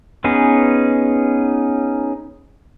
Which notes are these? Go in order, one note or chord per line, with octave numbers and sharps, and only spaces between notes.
B3 C#4 D#4 G#4 B4